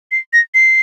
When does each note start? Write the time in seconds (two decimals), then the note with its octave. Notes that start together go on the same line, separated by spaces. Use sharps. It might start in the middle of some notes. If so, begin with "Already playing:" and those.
0.12 C7
0.33 A#6
0.54 C7